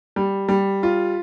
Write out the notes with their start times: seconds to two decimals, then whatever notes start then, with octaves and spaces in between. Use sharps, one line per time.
0.16 G3
0.49 G3
0.83 F4